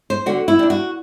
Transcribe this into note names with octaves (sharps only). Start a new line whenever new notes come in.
C5
D3 F#4
E4
G3 D4
F#4